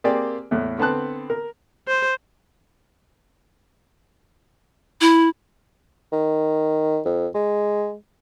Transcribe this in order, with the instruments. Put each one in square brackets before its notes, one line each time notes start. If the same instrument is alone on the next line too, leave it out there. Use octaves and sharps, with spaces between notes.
[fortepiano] A#3 C4 G4 G#4 D5
E2 A2
D3 B3 C4 A5 F#6
A#4
[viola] C5
[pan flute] E4
[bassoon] D#3
F2
G#3